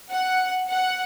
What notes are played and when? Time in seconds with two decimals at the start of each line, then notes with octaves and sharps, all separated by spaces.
0.12 F#5
0.69 F#5